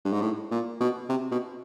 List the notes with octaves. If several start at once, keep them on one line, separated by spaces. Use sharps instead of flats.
G2
G#2
A2
A#2
B2
C3
B2